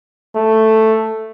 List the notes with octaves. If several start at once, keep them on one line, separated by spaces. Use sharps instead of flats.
A3